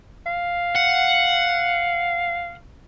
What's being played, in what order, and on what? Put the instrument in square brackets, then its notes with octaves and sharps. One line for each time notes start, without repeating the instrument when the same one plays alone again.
[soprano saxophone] F5
[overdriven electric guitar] F#5